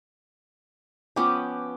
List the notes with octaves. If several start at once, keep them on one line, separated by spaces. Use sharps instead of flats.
F3 B3 C#4 G5 D6